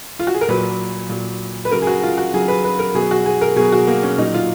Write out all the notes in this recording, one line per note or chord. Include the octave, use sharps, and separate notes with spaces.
F4
F#4
G#4
A#4
A#2 F#3 B4
A#2 F#3
B4
C#3 F#3 A#4
G#4
F#4
F4
F#4
C#3 F#3 G#4
B4
B4
A#4
B2 F#3 G#4
F#4
G#4
A#4
B2 F#3 G#4
F#4
A#3
C#4
A#2 F#3 D#4
F4